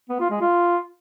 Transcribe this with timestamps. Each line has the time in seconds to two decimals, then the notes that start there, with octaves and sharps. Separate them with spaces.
0.09 B3
0.20 F4
0.31 G#3
0.41 F4